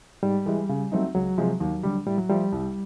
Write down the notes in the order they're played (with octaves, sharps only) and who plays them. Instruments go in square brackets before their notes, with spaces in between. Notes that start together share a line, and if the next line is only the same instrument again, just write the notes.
[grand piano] G#2 [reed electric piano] G3
[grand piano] E3 G#3
C#3
F#3 A3 C4 D#4
[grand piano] C#2 [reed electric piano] F#3
[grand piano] C3 F3 G#3
D#2
D3 G3
[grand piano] A2 [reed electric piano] G3
[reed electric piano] F#3
[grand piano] F3 A3 [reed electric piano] G3
[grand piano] C2